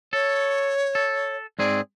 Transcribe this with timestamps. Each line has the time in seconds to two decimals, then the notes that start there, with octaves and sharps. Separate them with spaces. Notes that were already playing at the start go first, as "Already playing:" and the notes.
0.13 A4 C#5
0.95 A4
1.59 G#2 C4 G#4 D5